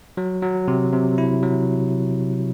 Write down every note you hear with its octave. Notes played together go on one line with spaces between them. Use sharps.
F#3
F#3
C3
C3
E4
F#3